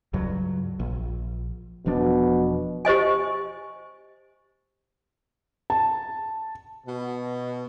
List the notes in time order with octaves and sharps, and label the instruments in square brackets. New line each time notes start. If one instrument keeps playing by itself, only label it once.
[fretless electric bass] C#2 G2 F#3
A#1
[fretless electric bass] E1 F3 D4 [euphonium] B2
[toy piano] G4 C5 D#5 G#5
[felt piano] A5
[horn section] B2